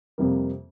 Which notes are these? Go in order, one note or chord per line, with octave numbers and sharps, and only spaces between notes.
F2 C3 G3 A#3